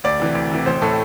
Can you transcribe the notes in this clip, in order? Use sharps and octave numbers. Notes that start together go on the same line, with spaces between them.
D2 D5
C3 E3
D2
C3 E3
A1 C5
A2 A3 A4